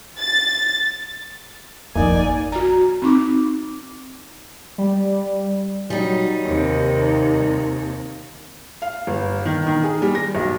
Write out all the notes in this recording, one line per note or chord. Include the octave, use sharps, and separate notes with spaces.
A6
G#1 F2 A#3 D#4 D5 G#5
F#4 A#5
C4 D#4 D6
G3
F#3 G3 D#4
D#2 C3 A#3
F5
G1
D#3
D#3
G#4
G3
A#6
B1